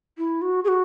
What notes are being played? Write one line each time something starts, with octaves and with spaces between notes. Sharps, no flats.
E4
F#4
G#4
F#4